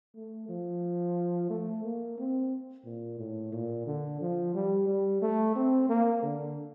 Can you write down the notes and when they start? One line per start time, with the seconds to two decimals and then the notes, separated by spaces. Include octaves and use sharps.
0.16 A3
0.49 F3
1.50 A3
1.84 A#3
2.18 C4
2.85 A#2
3.19 A2
3.53 A#2
3.87 D3
4.21 F3
4.54 G3
4.88 G3
5.22 A3
5.55 C4
5.89 A#3
6.23 D3